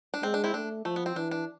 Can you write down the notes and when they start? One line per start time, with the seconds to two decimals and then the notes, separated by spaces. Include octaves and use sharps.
0.14 D4
0.22 G#3 C4
0.34 D4
0.44 C4 E4
0.54 A3 D4
0.85 F3 A3
0.96 B3
1.06 C4
1.16 E3 D4
1.31 D4